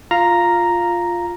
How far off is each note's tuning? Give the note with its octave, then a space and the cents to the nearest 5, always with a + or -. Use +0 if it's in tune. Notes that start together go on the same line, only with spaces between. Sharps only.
F4 +0 F5 -5 A#5 +0